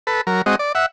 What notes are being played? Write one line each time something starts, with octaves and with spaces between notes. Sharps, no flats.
A4 B4
F#3 A#4
G#3 C4 F#4 D#5
D5
E5 F#5